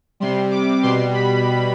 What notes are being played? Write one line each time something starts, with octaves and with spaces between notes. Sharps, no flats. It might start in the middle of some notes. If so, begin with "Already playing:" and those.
C3 G3 C6
D6
B2 G3 C6
B5